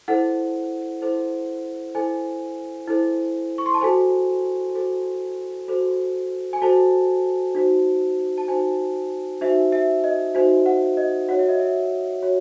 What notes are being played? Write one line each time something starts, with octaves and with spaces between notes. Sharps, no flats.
E4 A4 C5 F#5
E4 A4 C5
E4 A4 C5 G#5
E4 A4 C5
C#6
C6
A5
F#4 A4 C5 G#5
F#4 A4 C5
F#4 A4 C5
G#5
F#4 A4 C5 A5
D#4 F#4 C5
A5
D#4 F#4 C5 G#5
D#4 F#4 C5 E5
E5
D#5
D#4 F#4 C5
F#5
D#5
F#4 C#5 F#5
E5
D#5
E5
F#4 C#5